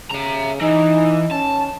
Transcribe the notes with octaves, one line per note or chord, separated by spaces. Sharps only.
C#3 E5 A#5
E3 D#4
C#4 A5